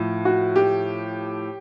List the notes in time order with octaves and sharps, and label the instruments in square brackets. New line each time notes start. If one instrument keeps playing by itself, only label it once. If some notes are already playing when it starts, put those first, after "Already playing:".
Already playing: [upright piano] A2 F3
F#4
G4